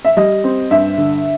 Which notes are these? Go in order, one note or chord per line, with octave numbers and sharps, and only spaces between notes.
E5
G3 D#5
C4
G2 E5
D3